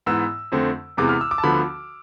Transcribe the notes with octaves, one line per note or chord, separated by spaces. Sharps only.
G#2 E3 B3 E6
F2 D3 A3 C4
E2 C3 E3 G#3 B3 D6
F6
E6
D6
A5
D2 D3 F3 B3 B5